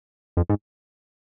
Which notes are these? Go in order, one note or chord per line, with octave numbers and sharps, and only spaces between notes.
F2
G#2